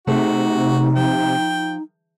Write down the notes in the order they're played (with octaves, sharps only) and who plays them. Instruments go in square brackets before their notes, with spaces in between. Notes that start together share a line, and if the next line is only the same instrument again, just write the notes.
[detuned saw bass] C3 [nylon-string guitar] A3 G#4 C5 [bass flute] D#4 [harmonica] F#4
[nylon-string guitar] F3 [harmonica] G5